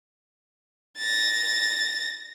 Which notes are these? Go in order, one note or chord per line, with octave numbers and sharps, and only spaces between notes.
A6 A#6